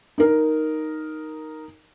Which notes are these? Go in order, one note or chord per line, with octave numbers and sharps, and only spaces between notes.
D#4 A#4